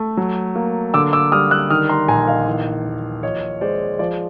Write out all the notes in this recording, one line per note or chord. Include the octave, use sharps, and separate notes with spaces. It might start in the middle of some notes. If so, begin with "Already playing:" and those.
Already playing: A3
F#3
A#3
D3 D6 E6
D6 E6
G3 D#6 F6
E6 F#6
D#3 D#6 F6
A#5 C6
A#1 G#5 A#5
D#5 F5
E3
D#2
F3 C#5 D#5
G#3 C5 D5
F3 C5 D5